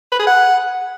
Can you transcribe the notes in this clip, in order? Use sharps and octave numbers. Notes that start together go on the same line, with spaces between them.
B4
G#4
F#5